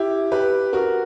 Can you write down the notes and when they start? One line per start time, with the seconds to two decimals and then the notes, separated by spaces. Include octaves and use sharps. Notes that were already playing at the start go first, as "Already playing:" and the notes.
Already playing: E4 G4
0.32 G4 B4
0.73 F#4 A#4